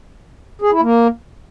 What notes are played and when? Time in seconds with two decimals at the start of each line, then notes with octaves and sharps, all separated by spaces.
0.62 G#4
0.72 E4
0.82 A#3